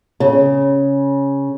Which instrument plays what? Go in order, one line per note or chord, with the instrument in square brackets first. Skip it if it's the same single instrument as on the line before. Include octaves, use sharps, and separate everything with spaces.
[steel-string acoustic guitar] C#3